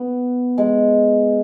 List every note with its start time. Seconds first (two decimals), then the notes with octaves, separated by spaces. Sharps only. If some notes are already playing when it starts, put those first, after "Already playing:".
Already playing: B3
0.58 G#3